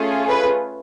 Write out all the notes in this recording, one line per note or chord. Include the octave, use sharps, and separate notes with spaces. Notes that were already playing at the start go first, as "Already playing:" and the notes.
Already playing: A3 C#4 F4 G#4
B4